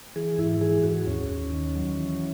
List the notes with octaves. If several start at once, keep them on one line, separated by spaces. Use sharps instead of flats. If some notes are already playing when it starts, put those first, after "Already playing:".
E3 G#4
G#2 E4
E3 G#4
G#2 F#4
D#2 C#4
D#2
D#3
F#3
E3